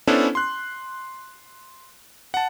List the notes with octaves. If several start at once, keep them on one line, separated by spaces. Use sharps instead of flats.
B3 C#4 D4 E4 A4 C5
C6 F#6
F#5 A5